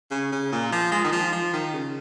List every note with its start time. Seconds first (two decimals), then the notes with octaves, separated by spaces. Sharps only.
0.11 C#3
0.32 C#3
0.52 A#2
0.72 F3
0.92 G#3
1.04 D#3
1.12 F3
1.32 F3
1.53 D#3
1.74 C#3